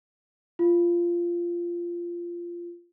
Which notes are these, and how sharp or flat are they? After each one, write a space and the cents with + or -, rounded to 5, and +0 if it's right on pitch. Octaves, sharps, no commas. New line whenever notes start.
F4 -15